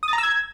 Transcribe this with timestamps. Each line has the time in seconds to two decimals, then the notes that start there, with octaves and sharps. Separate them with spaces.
0.03 D#6
0.08 A6
0.13 A#5
0.18 E6
0.23 G#6